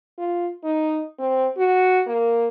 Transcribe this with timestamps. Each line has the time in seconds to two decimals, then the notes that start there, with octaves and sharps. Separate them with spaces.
0.18 F4
0.64 D#4
1.19 C4
1.57 F#4
2.07 A#3